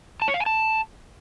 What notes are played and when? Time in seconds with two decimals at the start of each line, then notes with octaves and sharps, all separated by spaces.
0.22 A5
0.28 C#5
0.34 F5
0.40 G#5
0.46 A5